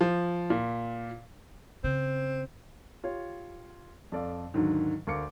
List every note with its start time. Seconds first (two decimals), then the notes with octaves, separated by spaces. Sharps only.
0.01 F3
0.50 A#2
1.84 C#3 C4
3.04 F4 G4 C#5
4.12 F2 A4 D5 F5
4.54 D#2 G#2 D3 D#3 F#3
5.07 D2 A#4 F5 D6 C#7